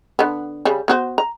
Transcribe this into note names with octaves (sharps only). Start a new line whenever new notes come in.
D3 B3
C#3 G3
B3 F#4 C5
A#5